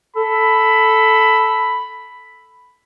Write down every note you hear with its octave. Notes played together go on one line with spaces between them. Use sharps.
A4 B5